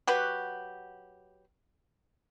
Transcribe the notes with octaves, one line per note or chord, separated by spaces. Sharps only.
F#3 F#4 G4 B4